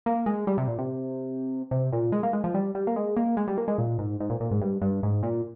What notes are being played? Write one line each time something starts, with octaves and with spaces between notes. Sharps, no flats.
A#3
G#3
G3
C3
A#2
C3
C3
A#2
G#3
A#3
G#3
F3
G3
G3
A#3
G#3
A#3
G#3
G3
A#3
G#3
A#2
G#2
G#2
A#2
A#2
G#2
G2
G2
G#2
A#2